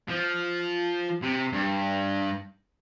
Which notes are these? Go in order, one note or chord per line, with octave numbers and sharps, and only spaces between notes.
F3
C3
G2